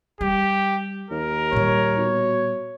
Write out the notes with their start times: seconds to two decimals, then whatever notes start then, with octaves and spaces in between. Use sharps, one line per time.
0.21 G3 G4
1.10 D#2 A#4
1.53 A#2 G3 C#5
1.98 B2